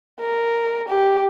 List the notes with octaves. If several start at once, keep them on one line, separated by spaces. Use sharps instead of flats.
A#4
G4